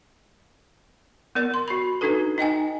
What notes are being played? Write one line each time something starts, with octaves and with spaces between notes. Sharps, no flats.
B3 A#4 D5
C6
F#4 B5
D4 D#4 F#4 A4 B4
D#4 D#5 G5 G#5